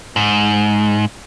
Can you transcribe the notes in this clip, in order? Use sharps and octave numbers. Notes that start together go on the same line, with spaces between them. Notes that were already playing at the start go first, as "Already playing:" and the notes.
G#2